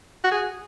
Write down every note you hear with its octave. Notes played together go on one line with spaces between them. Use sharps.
F#4
G#4